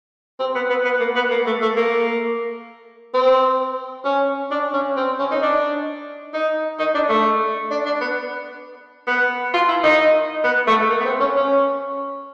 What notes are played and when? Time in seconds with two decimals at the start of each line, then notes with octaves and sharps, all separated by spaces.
0.40 C4
0.55 B3
0.70 B3
0.85 B3
1.00 A#3
1.16 B3
1.31 A#3
1.46 A3
1.62 A3
1.77 A#3
3.14 C4
4.05 C#4
4.51 D4
4.73 C#4
4.97 C4
5.19 C#4
5.31 D#4
5.42 D4
6.34 D#4
6.79 D#4
6.95 D4
7.09 A3
7.71 D4
7.86 D4
8.01 B3
9.07 B3
9.54 F4
9.69 E4
9.84 D#4
10.44 B3
10.68 A3
10.90 A#3
11.00 B3
11.05 C4
11.20 C#4
11.36 C#4